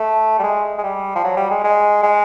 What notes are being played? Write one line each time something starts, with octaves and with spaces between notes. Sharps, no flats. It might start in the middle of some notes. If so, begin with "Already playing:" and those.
Already playing: A3
G3
G#3
G#3
G3
F3
F#3
G3
G#3
G#3
G#3